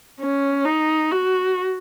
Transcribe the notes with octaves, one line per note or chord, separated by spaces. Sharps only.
C#4
D#4
F#4